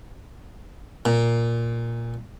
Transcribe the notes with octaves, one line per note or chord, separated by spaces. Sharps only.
A#2